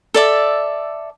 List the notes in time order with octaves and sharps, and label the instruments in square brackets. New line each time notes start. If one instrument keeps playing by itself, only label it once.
[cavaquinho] A4 D5 E5